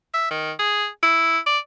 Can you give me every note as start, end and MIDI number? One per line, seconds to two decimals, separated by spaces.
0.14 0.28 76
0.31 0.52 51
0.59 0.87 68
1.03 1.39 64
1.46 1.58 74